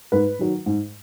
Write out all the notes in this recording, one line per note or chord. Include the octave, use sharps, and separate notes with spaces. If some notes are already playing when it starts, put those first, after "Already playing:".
G#2 B4
D#3 F#3
G#2